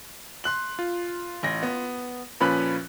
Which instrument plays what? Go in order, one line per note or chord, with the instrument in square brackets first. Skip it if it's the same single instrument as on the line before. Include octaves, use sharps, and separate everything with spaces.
[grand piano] C6 F#6 F#7
[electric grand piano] F4
[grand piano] A1 A#6
B3
[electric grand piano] A#2 F3 C#4 [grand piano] B4 B5 F#6